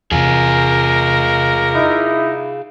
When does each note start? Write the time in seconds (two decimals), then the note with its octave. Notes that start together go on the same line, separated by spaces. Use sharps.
0.12 E2 C3 F4 G#4 A#4
1.73 D#4 E4